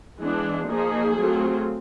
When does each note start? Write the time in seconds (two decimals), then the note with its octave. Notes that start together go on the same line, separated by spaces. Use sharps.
0.20 E3 G#3 B3 D4
0.68 F3 A#3 D#4 G#4
1.17 F#3 A3 C4 F4